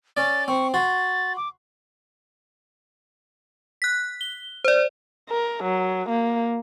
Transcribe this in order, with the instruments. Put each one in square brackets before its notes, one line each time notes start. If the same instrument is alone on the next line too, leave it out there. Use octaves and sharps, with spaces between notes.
[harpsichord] C#4 D5 [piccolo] A6
[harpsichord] C4 [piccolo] C#6
[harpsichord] F#4 C6 [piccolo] A6
[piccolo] D6
[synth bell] F#6 B6
G7
C5 D5
[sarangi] A#4
F#3
A#3